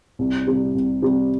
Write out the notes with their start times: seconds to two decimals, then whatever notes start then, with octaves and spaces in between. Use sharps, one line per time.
0.19 C2
0.47 C3 G3
0.75 C2
1.02 C3 G3